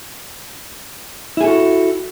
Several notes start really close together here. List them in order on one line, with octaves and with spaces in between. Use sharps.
E4 G#4 A4 F#4